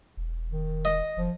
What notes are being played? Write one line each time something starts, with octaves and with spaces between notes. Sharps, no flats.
E1
D#3
D#5
F1 F3